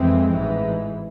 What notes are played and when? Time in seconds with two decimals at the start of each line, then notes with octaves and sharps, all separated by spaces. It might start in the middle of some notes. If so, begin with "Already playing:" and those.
Already playing: F2 E3 G#3 C4
0.30 A1 G#2 E3